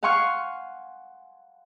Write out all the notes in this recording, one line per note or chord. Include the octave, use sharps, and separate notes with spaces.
F5 F#5 G#5 C6 C#6 F6